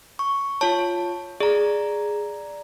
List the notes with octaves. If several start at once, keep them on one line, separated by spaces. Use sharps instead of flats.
C#6
F4 C#5 A5
G#4 D5 A#5